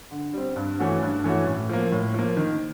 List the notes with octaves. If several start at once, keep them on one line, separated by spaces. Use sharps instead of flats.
D3
G3 C4
G2
E3 A3 C#4 F#4
G2
E3 A3 C#4 F#4
A2
F3 A#3
A2
F3 A#3
D#3